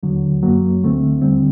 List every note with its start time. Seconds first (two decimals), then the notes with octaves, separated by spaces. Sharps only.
0.03 D#2 D3 F#3
0.43 F#2 F#3 A#3
0.82 D2 D3 A3 C4
1.22 D#2 D3 G3 C4